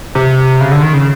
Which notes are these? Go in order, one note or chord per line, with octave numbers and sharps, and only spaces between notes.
C3
C#3
D3
D#3
C#3